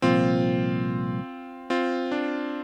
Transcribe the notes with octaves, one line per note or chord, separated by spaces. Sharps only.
C2 A#2 F3 C4 F4
C4 F4
D4